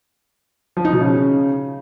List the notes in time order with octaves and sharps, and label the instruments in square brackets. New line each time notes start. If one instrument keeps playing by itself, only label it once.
[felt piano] F3
D#4
B2
C#3